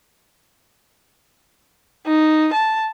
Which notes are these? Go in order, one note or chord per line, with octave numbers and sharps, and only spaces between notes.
D#4
A5